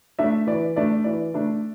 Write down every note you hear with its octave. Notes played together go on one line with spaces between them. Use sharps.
A3 D4 E5
E3 D5
A3 D4 D5
E3 D5
A3 D4